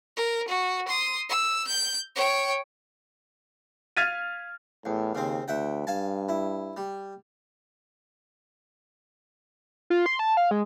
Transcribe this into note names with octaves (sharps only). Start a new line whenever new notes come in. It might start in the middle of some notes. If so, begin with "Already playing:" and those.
A#4
F#4
C6 D#6
E6
G6
C#5 G5
F5 F6 G#6 A6 B6 D#7
E2 A2
D#2 C#3 C4
D2 E5 F#5 G5
G2 F5 G#5 A5
E4
G3
F4
C6
A5
F5
G#3